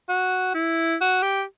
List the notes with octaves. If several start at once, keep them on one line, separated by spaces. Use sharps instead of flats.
F#4
E4
F#4
G4